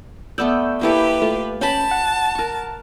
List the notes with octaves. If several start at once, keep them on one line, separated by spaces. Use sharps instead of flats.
A3 B3 D5 E6 G6
A#3 E4 G4 A4 B4
A3 F4
C#4 G5 A5 B5
F#5
A#4 C#6